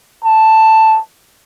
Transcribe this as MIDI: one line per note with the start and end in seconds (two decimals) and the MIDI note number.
0.24 0.99 81